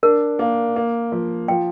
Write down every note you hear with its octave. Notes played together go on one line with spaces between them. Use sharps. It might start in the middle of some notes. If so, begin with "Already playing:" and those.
D4 A#4
A#3
A#3
F3
F3 G5